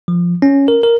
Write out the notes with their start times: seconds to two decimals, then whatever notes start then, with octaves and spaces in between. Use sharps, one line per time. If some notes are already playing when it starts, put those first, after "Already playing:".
0.08 F3
0.42 C#4
0.68 A#4
0.83 A#4